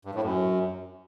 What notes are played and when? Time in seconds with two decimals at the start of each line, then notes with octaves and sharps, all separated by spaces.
0.05 G2
0.14 A2
0.24 F#2